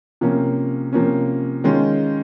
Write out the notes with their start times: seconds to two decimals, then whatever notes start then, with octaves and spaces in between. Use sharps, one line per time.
0.21 C3 F3 A#3 C#4
0.93 C3 F3 A#3 C#4
1.64 D#3 G#3 C#4 F4